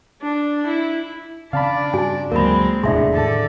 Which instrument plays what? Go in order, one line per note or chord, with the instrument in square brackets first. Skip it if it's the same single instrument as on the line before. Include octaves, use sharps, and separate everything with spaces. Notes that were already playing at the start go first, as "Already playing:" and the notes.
[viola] D4
E4
[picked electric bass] C#3 C4 [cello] D4 D5 [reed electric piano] F5 A5 B5
[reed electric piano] G2 [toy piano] F#4 G#5
[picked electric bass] D2 F#3 [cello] G#3 C4 [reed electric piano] A#3 [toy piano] A#4 B5
[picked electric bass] D#1 E2 C3 [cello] A2 [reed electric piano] D4 G#4 [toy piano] E5 C6
[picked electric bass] A2 D#3 [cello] D3 A4